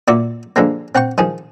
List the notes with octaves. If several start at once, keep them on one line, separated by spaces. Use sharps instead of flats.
A#2 F#4 D5 E5
D3 F3 G#3 A#3
C4 F#5 G5 C#6
D#3 F3 G#4